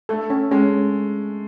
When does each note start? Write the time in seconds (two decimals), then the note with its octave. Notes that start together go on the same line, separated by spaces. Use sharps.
0.09 A3 A4
0.30 C#4
0.51 G#3 C#4